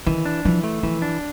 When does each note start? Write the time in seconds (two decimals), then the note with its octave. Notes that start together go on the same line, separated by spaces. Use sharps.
0.06 D#3 E3
0.26 D4
0.45 E3 F3
0.64 A3
0.83 E3 F3
1.02 D4